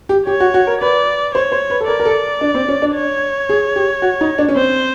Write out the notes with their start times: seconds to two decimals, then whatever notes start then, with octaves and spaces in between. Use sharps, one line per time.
0.09 G4
0.27 G4 C#5
0.40 F#4
0.54 F#4
0.67 A#4
0.81 B4 D5
1.35 C5 C#5
1.52 C5
1.70 B4
1.81 A4
1.88 A#4 D5
2.00 A#4
2.05 A4
2.41 D4
2.54 C4
2.68 C#4
2.82 D4
2.95 C#5
3.49 G#4
3.76 G4
4.02 F#4
4.21 D#4
4.38 D4
4.48 C#4
4.55 C4 C5